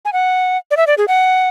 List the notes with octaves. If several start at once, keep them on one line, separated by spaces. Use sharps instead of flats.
G#5
F#5
D5
E5
D5
G#4
F#5